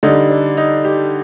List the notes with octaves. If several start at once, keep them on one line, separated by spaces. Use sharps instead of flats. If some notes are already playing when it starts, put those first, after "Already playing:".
D3 G3 D#4
D4
D#4
G4